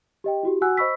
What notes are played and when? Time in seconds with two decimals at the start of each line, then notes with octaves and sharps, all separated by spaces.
0.24 G4 D#5 G5
0.43 E4 F#4 G4
0.61 F#4 F#5 G#5 E6 F#6
0.77 C5 D#5 B5 C#6 E6 B6